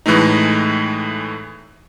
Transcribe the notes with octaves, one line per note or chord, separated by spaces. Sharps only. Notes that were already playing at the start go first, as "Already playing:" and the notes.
A2 E3 G#3 A3 D#4